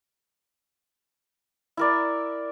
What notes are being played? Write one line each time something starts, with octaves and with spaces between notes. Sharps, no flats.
E4 A#4 D5